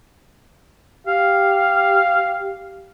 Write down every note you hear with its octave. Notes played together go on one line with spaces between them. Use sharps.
G4 F5